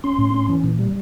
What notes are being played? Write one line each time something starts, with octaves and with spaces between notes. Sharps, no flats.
C#4 C6
A2
C#4
E3
A#2
G3